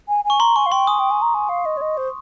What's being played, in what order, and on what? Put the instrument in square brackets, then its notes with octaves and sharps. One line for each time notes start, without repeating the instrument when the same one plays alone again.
[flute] G#5
G#5
[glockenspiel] C#6
[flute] A#5 [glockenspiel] C6
[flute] G#5 [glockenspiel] C#6
[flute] F5
[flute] G5 [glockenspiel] C6
[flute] G#5 [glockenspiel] D#6
[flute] G5
G#5
A#5
G#5
F5
D#5
C#5
D#5
C5